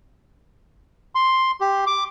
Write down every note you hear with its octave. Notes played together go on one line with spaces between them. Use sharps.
C6
G4
D6